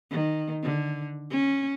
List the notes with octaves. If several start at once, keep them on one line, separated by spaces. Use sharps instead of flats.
D#3
D3
C#4